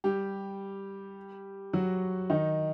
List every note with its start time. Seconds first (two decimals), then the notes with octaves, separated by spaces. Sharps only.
0.04 G3 G4
1.73 F#3 F#4
2.30 D#3 D#4